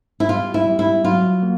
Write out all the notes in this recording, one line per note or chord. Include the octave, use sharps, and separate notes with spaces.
E4
G3 F4
E4
G3
E4
F#3 F4
A#3